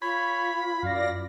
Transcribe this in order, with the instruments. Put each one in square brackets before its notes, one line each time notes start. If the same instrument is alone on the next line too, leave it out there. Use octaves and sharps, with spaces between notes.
[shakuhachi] F4 [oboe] C#5 [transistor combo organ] B5
[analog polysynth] F#2 D5 A#6 [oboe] F5